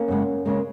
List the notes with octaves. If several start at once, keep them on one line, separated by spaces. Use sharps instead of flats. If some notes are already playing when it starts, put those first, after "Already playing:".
Already playing: A#3 C#4
F#2 C#3 G#3
C#3 G#3 A#3